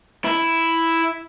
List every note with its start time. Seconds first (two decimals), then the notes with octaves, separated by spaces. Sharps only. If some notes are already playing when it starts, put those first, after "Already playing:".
0.25 E4